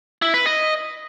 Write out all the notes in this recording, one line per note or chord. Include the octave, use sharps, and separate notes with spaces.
E4
B4
D#5